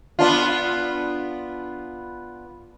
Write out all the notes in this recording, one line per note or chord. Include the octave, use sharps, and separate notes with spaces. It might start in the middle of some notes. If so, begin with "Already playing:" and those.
B3 D4 F4